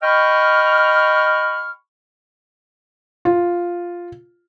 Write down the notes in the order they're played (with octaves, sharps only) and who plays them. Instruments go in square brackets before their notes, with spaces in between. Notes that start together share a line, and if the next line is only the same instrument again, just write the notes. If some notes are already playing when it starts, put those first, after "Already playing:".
[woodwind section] D#5 G5 B5 C#6 F6
[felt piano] F4